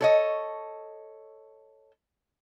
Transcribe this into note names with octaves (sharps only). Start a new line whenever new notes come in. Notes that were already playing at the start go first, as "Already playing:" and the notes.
A4 C#5 D#5